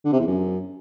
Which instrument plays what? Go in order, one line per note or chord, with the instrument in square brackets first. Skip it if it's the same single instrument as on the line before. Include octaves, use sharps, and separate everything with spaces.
[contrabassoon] D3
C3
E2
F#2